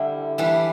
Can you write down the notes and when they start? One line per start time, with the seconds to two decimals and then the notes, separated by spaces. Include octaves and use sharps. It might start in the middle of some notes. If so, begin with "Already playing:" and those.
Already playing: D3 G3 D4 E4
0.38 E3 G3 D4